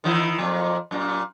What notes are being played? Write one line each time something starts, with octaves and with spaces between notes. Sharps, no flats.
D#3 E3 E4
F2 A#2 F3
F#2 A#2